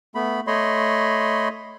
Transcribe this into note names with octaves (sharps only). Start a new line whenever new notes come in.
A3 B3 B5
A3 C#5 D#5 B5 C6